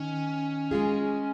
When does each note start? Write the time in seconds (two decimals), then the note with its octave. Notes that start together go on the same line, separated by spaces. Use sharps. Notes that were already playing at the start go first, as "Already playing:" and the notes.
Already playing: D#3 C#4
0.71 G#3 F4 G#4